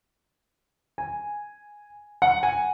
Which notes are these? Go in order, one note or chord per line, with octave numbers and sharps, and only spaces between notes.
G#5
F#5
G#5